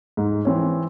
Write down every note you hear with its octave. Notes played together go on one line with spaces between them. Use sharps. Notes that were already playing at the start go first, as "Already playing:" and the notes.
G#2
E3 C4 C#5